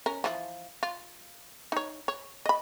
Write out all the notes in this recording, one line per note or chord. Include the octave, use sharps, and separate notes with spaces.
C#4 A#4
E3 F3
F4
D#4 C#5
C#5
D#5 B5